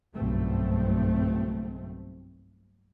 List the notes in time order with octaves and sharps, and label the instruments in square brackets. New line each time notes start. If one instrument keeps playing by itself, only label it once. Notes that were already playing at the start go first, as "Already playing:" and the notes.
[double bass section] F#1 B1 G2 B2 A3 C4